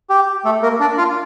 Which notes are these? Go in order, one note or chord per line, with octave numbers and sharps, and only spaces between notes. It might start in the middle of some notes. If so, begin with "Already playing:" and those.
G4
A3 A4
A#3 A#4
D4 D5
F4 F5